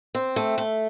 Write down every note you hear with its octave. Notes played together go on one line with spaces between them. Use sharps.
C4
A3
A3